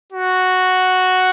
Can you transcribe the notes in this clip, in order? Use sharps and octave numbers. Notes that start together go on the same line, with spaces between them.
F#4